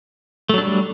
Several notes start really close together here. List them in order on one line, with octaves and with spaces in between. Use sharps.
A3 F#3 D4 G3